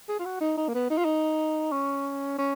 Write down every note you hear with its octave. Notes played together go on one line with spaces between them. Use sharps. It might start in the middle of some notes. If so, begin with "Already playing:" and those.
G#4
F4
F#4
D#4
D#4
A#3
B3
D#4
F4
D#4
C#4
C#4